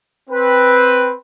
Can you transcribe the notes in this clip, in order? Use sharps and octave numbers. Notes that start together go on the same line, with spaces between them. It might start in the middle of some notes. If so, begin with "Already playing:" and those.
C4 B4